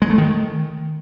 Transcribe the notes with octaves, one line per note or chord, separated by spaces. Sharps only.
G#3
A3
D#3